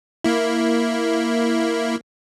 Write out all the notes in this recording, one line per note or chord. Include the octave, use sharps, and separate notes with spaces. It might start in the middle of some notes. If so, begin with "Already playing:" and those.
A#3 E4